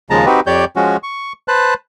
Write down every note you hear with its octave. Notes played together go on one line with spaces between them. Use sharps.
D#2 C#3 F3 G#3 A5 A#5
C4 D#4 F#4 G4 B4
F2 G4 C#5 D5 G6
F3 G#3 C#4 F#4
C#6
B4 C5 A5 F#6